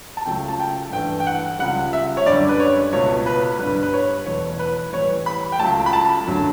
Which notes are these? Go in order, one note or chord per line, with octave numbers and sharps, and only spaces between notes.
A5
C#2 C#3 F#3 A3 G5
A5
G5
G2 E3 A3 G5
G5
F#5
C#2 C#3 G3 F#5
E5
C#5
F#2 D3 G3 D5
B4
C#5
C#2 B2 A3 C#5
B4
G2 D3 G3 B4
B4
C#5
E2 B2 F#3 A3 C#5
B4
A2 E3 G3 C#5
B5
G5
C#2 C#3 F#3 A3 A5
B5
A5
F#2 D3 F#3 A3